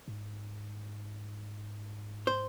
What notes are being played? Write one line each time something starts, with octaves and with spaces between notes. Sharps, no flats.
G#2
C5